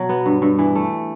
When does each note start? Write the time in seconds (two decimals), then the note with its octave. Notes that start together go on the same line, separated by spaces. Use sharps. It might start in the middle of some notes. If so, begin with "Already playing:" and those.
Already playing: B2 F#3
0.09 B3
0.26 G2
0.42 G2
0.59 E3
0.75 A3